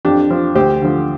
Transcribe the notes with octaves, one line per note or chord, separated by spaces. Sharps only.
F2 D4 G4
F3
D2 G4 C5
D3 F3